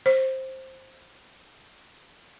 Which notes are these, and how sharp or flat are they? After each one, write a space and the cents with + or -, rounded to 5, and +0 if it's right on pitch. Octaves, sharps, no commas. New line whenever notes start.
C5 +10